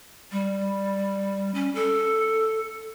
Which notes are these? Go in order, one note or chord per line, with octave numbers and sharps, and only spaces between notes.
G3
C#4
A4